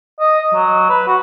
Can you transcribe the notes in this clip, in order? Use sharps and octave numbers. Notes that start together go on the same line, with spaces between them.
D#5
F#3
B4
F#4